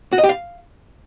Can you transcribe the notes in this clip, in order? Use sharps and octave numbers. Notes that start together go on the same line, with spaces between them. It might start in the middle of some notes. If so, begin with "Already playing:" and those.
F#4
D#5
G4
F5